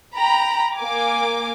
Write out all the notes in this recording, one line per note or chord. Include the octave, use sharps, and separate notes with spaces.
G5 A#5 B5
A#3 G#5 D6